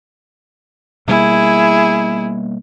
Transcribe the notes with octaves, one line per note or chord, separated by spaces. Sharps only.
B2 G3 A#3 E4 G#4